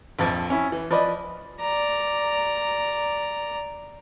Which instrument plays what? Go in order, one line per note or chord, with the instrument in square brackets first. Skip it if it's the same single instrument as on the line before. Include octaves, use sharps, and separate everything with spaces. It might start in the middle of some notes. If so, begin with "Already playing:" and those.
[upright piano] A#1 F2 F3
C#4 E4
E3
F3 B4 D5 D#5
[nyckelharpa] D5 A#5